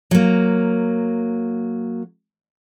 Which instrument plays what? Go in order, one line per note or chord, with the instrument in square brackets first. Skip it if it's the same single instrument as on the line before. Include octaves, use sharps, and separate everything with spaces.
[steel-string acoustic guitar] F#3 A#3